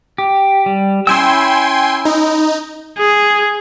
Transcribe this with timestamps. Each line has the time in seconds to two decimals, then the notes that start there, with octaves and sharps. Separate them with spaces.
0.18 G4
0.66 G3
1.07 C#4 E4 G5 G#5 C6 E6
2.05 D#4
2.98 G#4